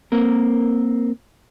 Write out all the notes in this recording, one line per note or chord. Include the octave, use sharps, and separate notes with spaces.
A#3 C4 A#4